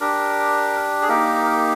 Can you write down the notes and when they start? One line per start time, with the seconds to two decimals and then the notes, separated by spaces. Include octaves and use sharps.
0.01 D4 G4 A#4
1.02 G#4
1.08 A#3 D#4 G4 A#4